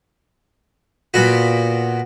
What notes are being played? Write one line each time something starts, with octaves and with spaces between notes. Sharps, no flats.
A#2 B3 F#4